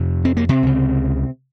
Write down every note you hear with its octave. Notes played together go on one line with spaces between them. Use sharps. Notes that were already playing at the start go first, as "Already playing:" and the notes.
Already playing: F2 C3
C4
A#3
C3 C4
C#2 C#3